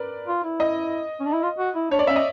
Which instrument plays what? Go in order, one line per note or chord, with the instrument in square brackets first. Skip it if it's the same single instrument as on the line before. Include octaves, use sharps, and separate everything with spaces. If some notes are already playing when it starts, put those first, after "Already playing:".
Already playing: [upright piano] A#4 B4 D5
[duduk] F4
E4
[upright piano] D#5
[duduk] C#4
D4
E4
F4
F#4
E4
[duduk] D4 [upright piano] C#5
[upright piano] D5
[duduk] C#4 [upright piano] E5
[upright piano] D#5